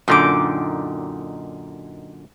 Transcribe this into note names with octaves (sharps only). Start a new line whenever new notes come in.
F#2 A#2 D3 D#4 G5 D6